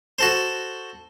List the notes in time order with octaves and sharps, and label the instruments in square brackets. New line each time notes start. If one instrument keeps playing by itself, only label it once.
[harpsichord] F#4 A4 C5